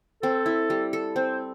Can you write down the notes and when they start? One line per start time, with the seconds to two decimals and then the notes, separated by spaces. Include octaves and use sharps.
0.22 C4 A4
0.46 E4
0.70 G3
0.93 A4
1.16 C4 C5